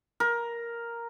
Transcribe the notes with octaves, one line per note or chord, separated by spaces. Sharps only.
A#4